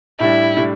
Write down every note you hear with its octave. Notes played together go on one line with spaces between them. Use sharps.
A2 G3 D4 E4
A2 G3 D4